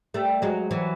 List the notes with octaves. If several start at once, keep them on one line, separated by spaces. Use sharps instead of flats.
G3 A3
F#3 G#3
E3 F#3